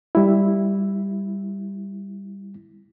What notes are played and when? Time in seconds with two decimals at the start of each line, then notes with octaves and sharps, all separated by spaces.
0.15 G3 E4